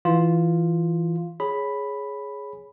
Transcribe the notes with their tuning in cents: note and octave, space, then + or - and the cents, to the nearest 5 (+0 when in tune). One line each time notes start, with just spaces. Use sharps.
E3 +0 F4 +0
G#4 +0 C#5 +0 B5 +0